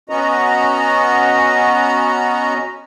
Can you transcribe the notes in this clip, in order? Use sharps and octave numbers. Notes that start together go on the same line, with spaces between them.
B3 C#4 F#4 D#5 A#5